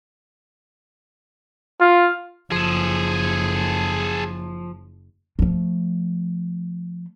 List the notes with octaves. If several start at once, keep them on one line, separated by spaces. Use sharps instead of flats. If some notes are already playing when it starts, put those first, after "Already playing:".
F4
F#1 F3 G#4 A4
F3 A3